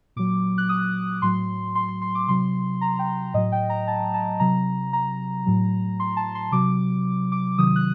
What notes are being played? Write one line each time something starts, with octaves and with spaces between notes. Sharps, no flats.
A#2 F#3 D6
F#6
D#6
A2 F#3 C6
C6
C6
C6
D6
C3 F#3 C6
A#5
G5
A2 F#3 D#5
G5
A#5
A5
A5
C3 F#3 A#5
A#5
A2 F#3
C6
A5
C6
C3 F#3 D6
D6
C3 D#3 F#3 D#6
F#6